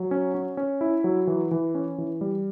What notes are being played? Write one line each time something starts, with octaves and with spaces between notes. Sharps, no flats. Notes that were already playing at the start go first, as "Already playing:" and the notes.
Already playing: F#3
C#4
C#4
C#4
E4
F#3
E3
E3
C#4
E3
G3